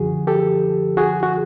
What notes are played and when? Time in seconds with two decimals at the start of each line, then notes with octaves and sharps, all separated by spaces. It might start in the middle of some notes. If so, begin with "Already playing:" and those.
Already playing: F#2 D3 F3 F#4 G#4
0.27 G4 A4
0.97 F#4 G#4
1.23 F#4